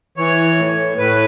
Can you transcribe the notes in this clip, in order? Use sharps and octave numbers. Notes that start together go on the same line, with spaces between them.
E3 C#5
A2
A2 B4